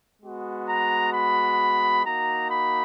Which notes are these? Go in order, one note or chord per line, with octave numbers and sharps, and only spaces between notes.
G#3 B3 F#4
A#5
B5
A#3 D#4 F#4 A#5
B5